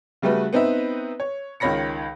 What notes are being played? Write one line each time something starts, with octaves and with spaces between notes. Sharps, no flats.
C#3 G3 A3 F#4 B4
B3 C4 D#4 B4 E5
C#5
C#2 D#3 C#5 B5 A#6 C#7